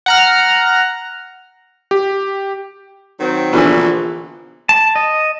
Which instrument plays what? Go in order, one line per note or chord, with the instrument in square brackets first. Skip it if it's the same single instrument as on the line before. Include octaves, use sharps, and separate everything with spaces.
[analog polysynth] F#5 A#5 F6
[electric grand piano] G4
[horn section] D#3 F#3 C4
[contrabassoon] A#1 [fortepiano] B2 D3 E3
[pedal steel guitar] A5
D#5